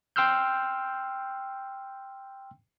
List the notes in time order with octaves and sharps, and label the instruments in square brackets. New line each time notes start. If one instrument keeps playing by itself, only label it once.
[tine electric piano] G5 C6 E6 F6 G6